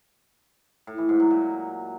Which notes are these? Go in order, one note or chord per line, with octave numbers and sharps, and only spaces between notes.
A2
E3
G#2
F#3
A#2